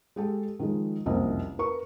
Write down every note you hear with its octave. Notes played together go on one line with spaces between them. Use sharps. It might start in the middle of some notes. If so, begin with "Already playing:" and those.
G#3 G4 A4
D#3 F3 G#3
F#1 C2 F2 A#3 C4 D#5
A#4 B4 C#6